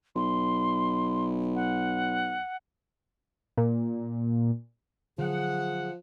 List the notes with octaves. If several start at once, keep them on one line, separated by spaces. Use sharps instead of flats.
B1 C6
F#5
A#2
D3 F3 F#3 G#4 F#5